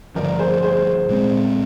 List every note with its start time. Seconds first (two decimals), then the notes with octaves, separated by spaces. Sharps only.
0.16 G2 D3 F3 A#4 D5
0.39 G#4 C5
0.63 G#4 C5
1.09 A#2 G#3 C4